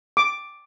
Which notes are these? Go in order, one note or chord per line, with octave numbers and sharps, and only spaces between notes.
D6